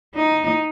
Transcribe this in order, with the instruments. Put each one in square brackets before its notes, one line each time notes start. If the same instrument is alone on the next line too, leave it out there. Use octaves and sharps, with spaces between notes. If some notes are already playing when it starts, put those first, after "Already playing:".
[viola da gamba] D#4